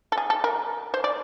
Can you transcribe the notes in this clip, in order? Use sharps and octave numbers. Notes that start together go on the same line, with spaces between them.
A4
G#4
A4
A#4
C5
D5